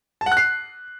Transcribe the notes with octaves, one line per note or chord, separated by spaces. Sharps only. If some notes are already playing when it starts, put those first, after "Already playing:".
A5
F#5
F#6
C7